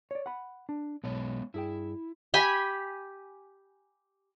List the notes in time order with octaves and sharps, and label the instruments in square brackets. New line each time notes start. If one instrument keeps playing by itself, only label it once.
[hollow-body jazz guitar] C#5 D5
F#5 B5
D4
[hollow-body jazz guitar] B1 [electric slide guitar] G#3 B3 C#5
[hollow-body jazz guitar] G2 G#4 G5 [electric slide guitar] E4
[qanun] G4 G5 G#5 B5